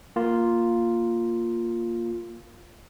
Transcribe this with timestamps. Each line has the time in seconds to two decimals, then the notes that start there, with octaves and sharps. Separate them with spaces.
0.16 A#3 F4